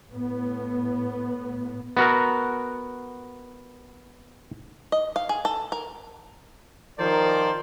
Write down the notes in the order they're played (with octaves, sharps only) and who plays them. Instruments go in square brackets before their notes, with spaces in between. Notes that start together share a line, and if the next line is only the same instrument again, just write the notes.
[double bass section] A2 B3
[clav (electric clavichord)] B3 F#4 A#4
[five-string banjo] D#5
F5
G#4
A4
A#4
[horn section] D#3 F3 A#4 C5 D5